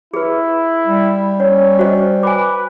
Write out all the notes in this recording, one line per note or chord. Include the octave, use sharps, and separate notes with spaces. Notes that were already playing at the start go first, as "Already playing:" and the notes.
E4 G#4 B4
G3
C#4 C#5
F#4 C5 D#5
B4 G#5 D6